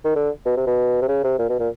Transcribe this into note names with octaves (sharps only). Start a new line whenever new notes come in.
D#3
D3
B2
C3
B2
C3
C#3
C3
A#2
B2
A#2